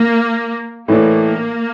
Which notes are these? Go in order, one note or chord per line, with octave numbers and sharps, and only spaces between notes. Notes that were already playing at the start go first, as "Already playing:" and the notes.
Already playing: A#3
A2 E3 A3 A#3 D4